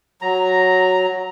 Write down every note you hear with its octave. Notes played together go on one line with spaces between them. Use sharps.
F#3 A#5